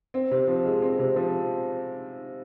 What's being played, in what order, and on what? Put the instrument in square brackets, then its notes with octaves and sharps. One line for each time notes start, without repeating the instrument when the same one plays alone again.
[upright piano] C4
C3
F3
G#3
C4
C3
F3